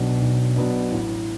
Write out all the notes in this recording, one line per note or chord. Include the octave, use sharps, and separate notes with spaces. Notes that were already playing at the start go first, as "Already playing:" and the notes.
Already playing: B1 B2 F#3 B3 D4
B1
B2 F#3 B3 D4
A1